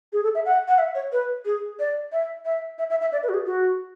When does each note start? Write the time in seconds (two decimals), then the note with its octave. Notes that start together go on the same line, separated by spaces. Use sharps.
0.13 G#4
0.24 A4
0.35 E5
0.45 F#5
0.68 F#5
0.78 E5
0.95 C#5
1.12 B4
1.46 G#4
1.79 D5
2.12 E5
2.45 E5
2.79 E5
2.90 E5
3.01 E5
3.12 D5
3.23 B4
3.29 F#4
3.34 G#4
3.46 F#4